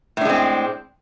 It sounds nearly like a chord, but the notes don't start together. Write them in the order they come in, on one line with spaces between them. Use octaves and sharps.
A2 D4 G#3 C4